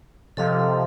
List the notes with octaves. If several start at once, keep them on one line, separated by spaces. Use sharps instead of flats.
C3 F3 A4 D#5 F5